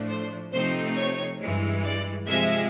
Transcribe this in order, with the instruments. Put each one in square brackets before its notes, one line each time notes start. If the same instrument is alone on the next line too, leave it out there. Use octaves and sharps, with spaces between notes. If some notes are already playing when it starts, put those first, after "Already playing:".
Already playing: [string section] A2 F3 A3 D4
C5
C3 F3 A3 C4 D#4 C5
C#5
G2 E3 G#3
D5
C3 F3 G#3 E5